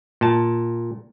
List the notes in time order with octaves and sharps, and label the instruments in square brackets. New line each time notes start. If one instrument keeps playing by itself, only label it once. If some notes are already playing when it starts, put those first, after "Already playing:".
[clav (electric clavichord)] A#2 A5